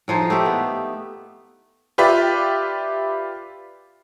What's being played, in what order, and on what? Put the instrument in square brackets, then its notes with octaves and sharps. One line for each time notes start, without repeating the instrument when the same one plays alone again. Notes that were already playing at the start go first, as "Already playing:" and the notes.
[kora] A2 F3 D#4 G#4
A3 G4
B3
[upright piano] F4 G4 B4 D5 E5